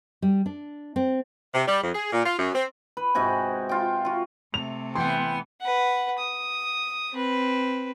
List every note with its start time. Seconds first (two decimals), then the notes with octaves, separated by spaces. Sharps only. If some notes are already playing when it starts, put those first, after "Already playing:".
0.22 G3
0.46 D4
0.96 C4
1.54 C3
1.68 G3
1.83 F2
1.95 G#4
2.13 A#2
2.26 F4
2.39 F#2
2.55 C4
2.97 B4
3.15 G#2 C3 F#4 G#5
3.69 F4 G5
4.05 F4 F#4
4.54 C3 A3 F7
4.95 E3 B3 G5 C6
5.61 B4 F#5
6.18 D#6
7.12 C4 B4